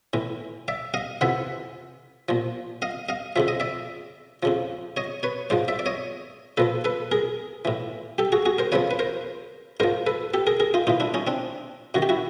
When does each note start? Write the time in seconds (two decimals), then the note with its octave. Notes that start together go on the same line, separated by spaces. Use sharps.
0.13 A2 E3
0.68 D5 E5
0.94 D#5 F5
1.21 F2 C3 E3 E5 F#5
2.29 A#2 F3
2.82 D#5 F5
3.09 D#5 F5
3.36 F2 C#3 F3 E5
3.48 D#5
3.60 D5 E5
4.43 F2 C#3 F3
4.97 C#5 D#5
5.23 B4 C#5
5.50 G#2 F3 C5 D5
5.68 D5 E5
5.79 D5
5.86 C#5 D#5
6.57 A#2 F3 A4 B4
6.85 A4 B4
7.12 G#4 A#4
7.65 A2 E3
8.18 G4 A4
8.32 F#4 G#4
8.46 F#4 G#4
8.58 A#4 C5
8.72 F2 C#3 F3 B4 C#5
8.91 B4
8.99 A#4 C5
9.80 G#2 F3 A#4 C5
10.07 A4 B4
10.34 G4 A4
10.47 G#4 A#4
10.60 G#4 A#4
10.74 D#4 F4
10.87 A2 E3 D#4 F4
11.00 D4 E4
11.14 C#4 D#4
11.27 C4 D4
11.94 F#2 D#3 F#4
12.02 G4
12.09 E4 F#4